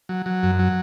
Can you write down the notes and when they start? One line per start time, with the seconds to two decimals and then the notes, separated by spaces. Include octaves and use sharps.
0.09 F#3
0.26 F#3
0.43 F#2
0.59 F#3